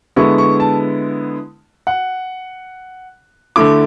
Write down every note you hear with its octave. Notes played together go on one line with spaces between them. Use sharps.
D3 G#3 B3 E4 C#6
C#6
A5
F#5
D3 A3 E4 D6